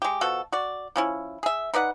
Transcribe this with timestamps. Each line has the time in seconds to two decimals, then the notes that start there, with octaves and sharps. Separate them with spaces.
0.02 G#3 G4
0.21 B2 F3 F#4 A4
0.52 F#4 D5
0.96 F3 C#4 E4
1.43 G#4 E5
1.74 D#4 B4 D5 F#5